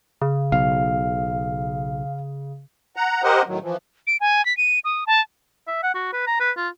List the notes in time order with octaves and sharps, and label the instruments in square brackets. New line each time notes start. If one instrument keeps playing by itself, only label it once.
[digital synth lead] C#3
[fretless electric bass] B1 [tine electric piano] F5
[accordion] F#5 A#5
G4 A#4 C5 D#5 F#5
A2 D#3 F#3
E3 F3
[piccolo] D7
G#5
B6
D#7
D#6
A5
[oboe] E5
F#5
F#4
B4
A#5
B4
F4